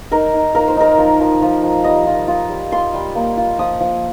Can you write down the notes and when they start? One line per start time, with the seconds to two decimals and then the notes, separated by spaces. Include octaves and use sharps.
0.11 D#4 A#4
0.33 D#4
0.55 F3 A#4
0.68 C5
0.77 D#4 A#4
0.98 F3
1.20 F3
1.42 F3
1.63 F3
1.84 G3 D#5
2.06 F4
2.28 F4
2.50 G3
2.72 F4 C6
2.94 G3
3.15 A#3
3.37 F4
3.59 F3 D#6
3.80 F3